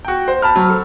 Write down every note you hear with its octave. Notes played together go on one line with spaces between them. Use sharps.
F#4 G5
C5
A5 B5 F6
F#3
A4